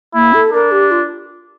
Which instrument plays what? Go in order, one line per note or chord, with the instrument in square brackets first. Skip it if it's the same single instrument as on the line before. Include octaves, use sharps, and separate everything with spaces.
[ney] A#3 [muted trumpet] E4
[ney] A4
[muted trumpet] D4 [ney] A#4
[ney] G4
F4